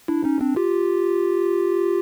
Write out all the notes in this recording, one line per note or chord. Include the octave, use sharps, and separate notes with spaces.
D4 E4
C#4 D#4
C4 D4
F4 G4